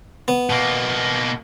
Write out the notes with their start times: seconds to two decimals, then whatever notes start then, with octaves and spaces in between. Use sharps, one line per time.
0.28 B3
0.50 B2 A#3